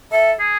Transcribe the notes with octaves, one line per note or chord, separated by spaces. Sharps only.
A4 E5
G#4